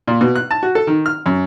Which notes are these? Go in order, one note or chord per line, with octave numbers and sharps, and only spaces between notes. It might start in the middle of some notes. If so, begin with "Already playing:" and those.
A#2
B2
F#6
A5
F#4
A4
D#3
F6
F#2